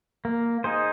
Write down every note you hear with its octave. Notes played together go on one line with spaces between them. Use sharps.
A#3
D#4 G#4 C5